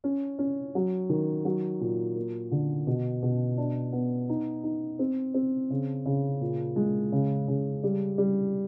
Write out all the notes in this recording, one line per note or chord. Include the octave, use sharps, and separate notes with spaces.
C#4
C#4
F#3
D#3
F#3
A#2
A#3
D3
B2
B2
D4
B3
D#4
D#4
C4
C4
C#3
C#3
A#2
G#3
C#3
C#3
G3
G3